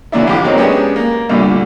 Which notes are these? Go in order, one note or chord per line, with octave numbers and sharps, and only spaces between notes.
D3 E3 F#3 D4 E4
A1 F3 G4 D6
F#3 C4 D#4 A#4 C#5
G#3 B3 C#4 D4 G4
A#3
C2 A#2 D3 G3 A3